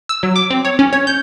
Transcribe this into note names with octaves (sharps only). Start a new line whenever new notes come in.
E6
F#3
D6
C4
C#5
C#4
C#5
G6